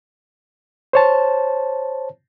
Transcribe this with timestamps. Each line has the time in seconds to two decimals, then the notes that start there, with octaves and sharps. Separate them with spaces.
0.93 C5 C#5 A5